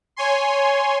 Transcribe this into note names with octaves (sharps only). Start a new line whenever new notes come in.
C#5 G#5 C6